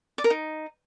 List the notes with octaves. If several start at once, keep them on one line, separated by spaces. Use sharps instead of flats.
D5
A#4
D#4